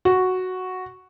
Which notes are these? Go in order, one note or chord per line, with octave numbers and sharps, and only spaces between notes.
F#4